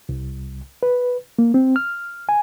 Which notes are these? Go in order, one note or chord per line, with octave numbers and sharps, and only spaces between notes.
C2
B4
A#3
C4
F6
G#5